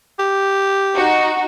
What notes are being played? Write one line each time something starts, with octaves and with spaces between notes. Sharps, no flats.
G4
D#4 F#4